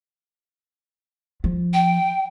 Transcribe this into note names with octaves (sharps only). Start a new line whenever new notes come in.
F3
G5